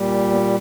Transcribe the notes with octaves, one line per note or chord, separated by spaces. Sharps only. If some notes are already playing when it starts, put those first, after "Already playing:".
Already playing: A#2 G3
A#3
B3